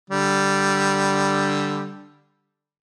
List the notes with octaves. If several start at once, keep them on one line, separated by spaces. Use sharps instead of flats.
D3 G3